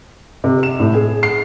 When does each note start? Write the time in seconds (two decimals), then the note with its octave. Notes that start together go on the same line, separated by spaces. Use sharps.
0.44 C3
0.63 E7
0.80 A2
0.94 G#4
1.23 C7